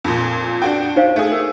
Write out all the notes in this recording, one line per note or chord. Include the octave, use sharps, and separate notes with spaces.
F2 A#2
D4 F#4 G5
D#4 C5 F5
A3 G#4
A#4